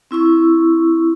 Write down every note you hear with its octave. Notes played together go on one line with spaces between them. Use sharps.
C4 E4 C#6 E6